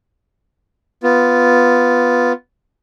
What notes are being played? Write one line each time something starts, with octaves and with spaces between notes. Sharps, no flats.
B3 F4